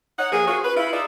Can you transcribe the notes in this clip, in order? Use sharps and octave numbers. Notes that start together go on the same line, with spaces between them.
D#4 C#5 F#5
F3 A#3 G#4
C#4 F4 F#4 G#4 C#5
B4
E4 F4
D#4 F4 G#4 D5 E5